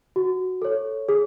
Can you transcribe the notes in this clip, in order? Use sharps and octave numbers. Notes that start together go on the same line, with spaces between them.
F#4
A4 C#5
G#4